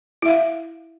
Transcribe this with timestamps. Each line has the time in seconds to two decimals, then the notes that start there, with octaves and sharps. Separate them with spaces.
0.22 E4
0.26 E5
0.29 F5